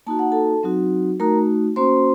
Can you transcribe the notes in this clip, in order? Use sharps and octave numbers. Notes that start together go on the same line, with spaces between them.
A#3 D#4 F#4 A5
F#5
A4 A5
F#3 C4 D#4 F#4
A3 D#4 F#4 A#4 A#5
A#3 C#4 F#4 C5 C6